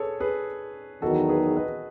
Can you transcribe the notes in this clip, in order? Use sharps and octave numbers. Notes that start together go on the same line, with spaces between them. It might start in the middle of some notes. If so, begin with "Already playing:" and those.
Already playing: G#4 A4 B4 C#5
G#4 B4
E2 D#3 F#3 B3 D#4 F#4 A4
G#4 B4
B4 D#5